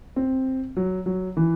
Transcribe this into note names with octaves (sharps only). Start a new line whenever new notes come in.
C4
F#3
F#3
E3